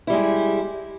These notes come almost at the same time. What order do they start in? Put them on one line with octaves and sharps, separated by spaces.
E4 G3 G#3